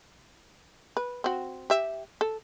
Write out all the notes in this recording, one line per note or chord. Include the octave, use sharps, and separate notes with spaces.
B4
C4 F#4
G4 E5
A4